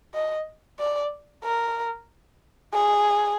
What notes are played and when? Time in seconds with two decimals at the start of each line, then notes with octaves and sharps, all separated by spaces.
0.15 D#5
0.80 D5
1.44 A#4
2.74 G#4